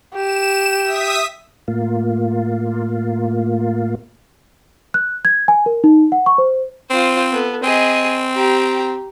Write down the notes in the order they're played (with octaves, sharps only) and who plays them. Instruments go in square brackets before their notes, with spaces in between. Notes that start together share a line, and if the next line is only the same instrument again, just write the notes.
[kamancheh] G4 [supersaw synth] E7
[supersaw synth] E5 D#6 B6
[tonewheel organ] A2 A#3 F4
[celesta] F#6
G#6
G#5
A#4
D#4
F#5
C#6
C5
[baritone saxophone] C4 [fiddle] F4 C5
[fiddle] B3 A4
[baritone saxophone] C4 [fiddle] G#4 D#5
[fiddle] G4 A#5